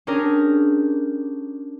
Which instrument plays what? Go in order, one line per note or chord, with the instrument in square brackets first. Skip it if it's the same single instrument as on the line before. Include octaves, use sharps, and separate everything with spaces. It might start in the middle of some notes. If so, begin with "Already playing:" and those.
[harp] C#4 D4 G4 G#4 A#4